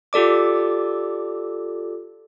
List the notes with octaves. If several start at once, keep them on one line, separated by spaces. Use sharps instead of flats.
F4 G4 A4 D5 D6